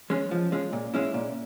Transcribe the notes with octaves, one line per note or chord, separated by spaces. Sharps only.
G#3 C#4
F3
G#3 C#4
A#2
G#3 C#4 E4
A#2